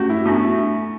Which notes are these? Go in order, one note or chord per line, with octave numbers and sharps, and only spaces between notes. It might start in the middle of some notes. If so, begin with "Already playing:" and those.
Already playing: A3 C#4 F#4 G4
E4
A3 B3 D4 F#4